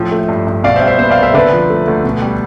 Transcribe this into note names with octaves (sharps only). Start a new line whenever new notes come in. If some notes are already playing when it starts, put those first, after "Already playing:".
Already playing: A2 F3
A3
G2
G2
B2 D5 F5
C5 E5
G3 F5
C5 E5
B3 C5 E5
D5 F5
C2
C5 E5
D3 B4 D5
F3
A3
D2
B2
G3